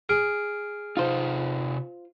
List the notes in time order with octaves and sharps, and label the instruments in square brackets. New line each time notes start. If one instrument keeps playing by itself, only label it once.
[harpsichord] G#4 [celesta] F6 D7
[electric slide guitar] C3 D#4 [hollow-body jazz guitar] F4 C5